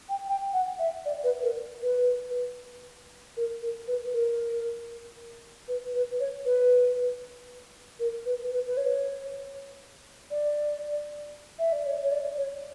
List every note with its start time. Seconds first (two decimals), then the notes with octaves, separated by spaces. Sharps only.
0.09 G5
0.28 G5
0.53 F#5
0.79 E5
1.05 D5
1.24 B4
1.43 A#4
1.83 B4
3.37 A#4
3.62 A#4
3.88 B4
4.14 A#4
5.68 B4
5.94 B4
6.20 C#5
6.45 B4
8.00 A#4
8.26 B4
8.52 B4
8.67 B4
8.77 C#5
10.31 D5
11.59 E5
11.72 D5
11.86 C#5
12.03 C#5
12.12 D5
12.37 C#5